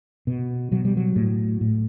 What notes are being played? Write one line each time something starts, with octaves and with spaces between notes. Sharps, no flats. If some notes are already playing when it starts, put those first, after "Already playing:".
B2
B2 F#3
G3
F#3
A2
A2